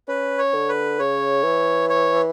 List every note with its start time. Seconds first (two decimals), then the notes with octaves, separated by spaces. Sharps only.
0.08 C#4 B4
0.39 C#5
0.54 D3
0.69 B4
0.99 C#3 C#5
1.44 E3
1.90 C#5